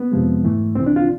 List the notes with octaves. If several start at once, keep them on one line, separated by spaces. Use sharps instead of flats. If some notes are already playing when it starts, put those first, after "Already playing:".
Already playing: B3
F2 C3 F3 G#3
G#2 E3 A3
C2 C3 E3 C4
D4
F4